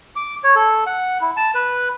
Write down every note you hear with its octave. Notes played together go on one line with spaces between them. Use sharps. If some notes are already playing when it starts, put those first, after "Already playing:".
D6
C#5
A4
F#5
E4
A5
B4